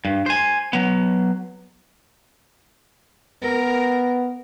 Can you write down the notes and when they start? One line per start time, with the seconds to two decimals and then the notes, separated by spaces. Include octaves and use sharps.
0.05 G2
0.26 C5 G#5
0.73 F#3 B3
3.43 B3 A#4